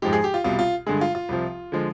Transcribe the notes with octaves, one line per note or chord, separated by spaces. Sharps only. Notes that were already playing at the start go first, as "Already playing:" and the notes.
G#2 F3 G#3 G4
G#4
G4
F4
C2 B2 G3 F4
F4
G2 D3 G#3 G#4
F4
F4
C2 C3 F3
D3 F3 G#3